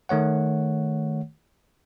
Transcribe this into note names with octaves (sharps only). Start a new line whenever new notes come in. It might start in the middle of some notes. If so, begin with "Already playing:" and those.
D#3 A3 C#5 F#5